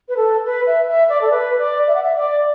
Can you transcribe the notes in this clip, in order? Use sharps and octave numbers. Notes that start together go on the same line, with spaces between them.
B4
A4
B4
E5
E5
D5
A4
B4
D5
E5
F#5
E5
D5